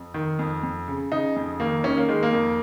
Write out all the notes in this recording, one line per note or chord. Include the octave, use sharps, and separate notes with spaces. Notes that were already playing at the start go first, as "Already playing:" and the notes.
Already playing: F2
D#3
F2
F2
C#3
C#3 D#4
F2
D#3 A#3
D#3 C#4
A#3
D#3 G#3
A#3
F2